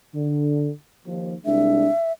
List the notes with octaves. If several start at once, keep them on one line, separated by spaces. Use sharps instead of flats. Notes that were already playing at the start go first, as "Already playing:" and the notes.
D3
D#2 F3
C2 G#3 D4 E5